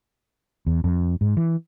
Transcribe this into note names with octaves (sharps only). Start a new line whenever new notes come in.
E2
F2
G#2
E3